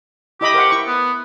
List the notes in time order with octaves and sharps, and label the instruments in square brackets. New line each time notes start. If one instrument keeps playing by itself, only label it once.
[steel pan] E4 D#5 B5 [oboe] G4
[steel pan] A#4 C5 F#5
E4 C#6
[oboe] B3